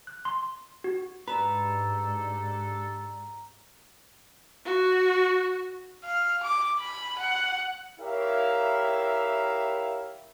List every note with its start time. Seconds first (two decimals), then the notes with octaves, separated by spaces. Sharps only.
0.07 F#6
0.25 C6
0.84 F#4
1.28 G#2 D4 G4 A4 B4 A#5 E7
4.65 F#4
6.04 F5
6.43 D6
6.80 B5
7.18 F#5
8.00 E4 G4 A#4 C#5 E5 F5